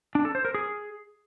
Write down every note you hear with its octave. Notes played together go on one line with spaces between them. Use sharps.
D4
A4
C5
A#4
G#4